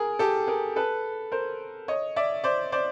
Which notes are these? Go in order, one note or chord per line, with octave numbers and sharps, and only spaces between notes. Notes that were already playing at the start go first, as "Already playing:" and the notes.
Already playing: G#4 A#4
G4 A4
G#4 A#4
A4 B4
A#4 C5
C#5 D#5
D5 E5
C5 D5
C5 D5